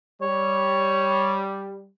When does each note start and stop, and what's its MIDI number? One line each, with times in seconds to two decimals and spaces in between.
0.21 1.85 55
0.21 1.41 73